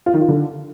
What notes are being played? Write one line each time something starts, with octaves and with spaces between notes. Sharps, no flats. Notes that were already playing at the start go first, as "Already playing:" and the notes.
F4
D#3
F4
D3